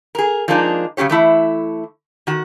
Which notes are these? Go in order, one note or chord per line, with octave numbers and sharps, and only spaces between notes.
G#4 A#4
F3 G#3 A#3 D4 D#4
C#3 F#3 C#4 G4 C#5
E3 A3 E4
D#3 F#4